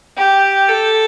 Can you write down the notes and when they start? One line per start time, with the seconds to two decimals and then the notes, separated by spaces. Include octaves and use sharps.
0.17 G4
0.69 A4